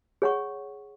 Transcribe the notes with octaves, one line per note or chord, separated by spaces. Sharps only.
G#4 C#5 F#5 C#6